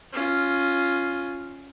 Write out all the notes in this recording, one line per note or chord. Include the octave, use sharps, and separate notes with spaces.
C#4 F4